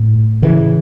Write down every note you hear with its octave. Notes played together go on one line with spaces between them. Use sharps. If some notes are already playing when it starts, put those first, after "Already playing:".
Already playing: A2
C#3 E3